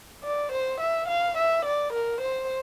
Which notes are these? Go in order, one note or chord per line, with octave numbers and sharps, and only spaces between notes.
D5
C5
E5
F5
E5
D5
A#4
C5